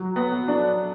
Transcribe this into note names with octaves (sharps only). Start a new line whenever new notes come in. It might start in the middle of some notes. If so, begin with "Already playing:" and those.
Already playing: F#3
B3
D4